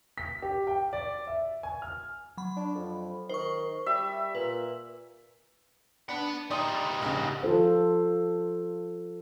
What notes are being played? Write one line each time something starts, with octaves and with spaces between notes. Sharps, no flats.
B6
G4
G5
D5
E5
G#5
F6
F#3 B5
D4
F2
D#3 C5 C#6
G3 E5
A#2 B4
D4 F#5 B5
G3 D#4 D5 C6 D#6
A#1 G#2 C#3
F3 F4 A4 C5